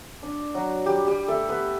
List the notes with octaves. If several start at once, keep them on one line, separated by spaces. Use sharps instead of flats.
D4
F#3 F#4
G3 G4
G3 G4
A3 A4
B3 B4